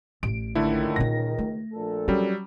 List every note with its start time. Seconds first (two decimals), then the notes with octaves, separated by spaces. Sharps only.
0.23 A1 A2 D7
0.55 C#2 D3 D#3 A3 E4
0.96 A#2 D#4 A#6
1.38 A3
1.74 A#1 A#2 A4
2.08 F#3 G3 C#4